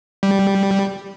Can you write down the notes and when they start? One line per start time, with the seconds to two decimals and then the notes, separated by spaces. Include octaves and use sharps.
0.23 G3